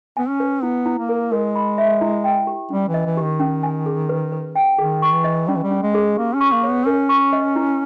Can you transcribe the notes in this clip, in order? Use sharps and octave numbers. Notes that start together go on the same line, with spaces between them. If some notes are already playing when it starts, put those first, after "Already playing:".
B3 G#5
C#4
B4
B3 E4
E4
A#3
A#4
G#3 A#4
B5
E5
E4
G5
G4
G3 C#4
E3
D#5
E3
G4
D#3
C#4
G#5
G#4
B4
B4
G5
D#3 G#4
C#6
E3
D#5
G3 C#4
E3
G3
C#4
G#3
G#4
A#3 G4
C#4
C#6
A#3
C#5
B3
C#4 A#4
C#6
D#5
E4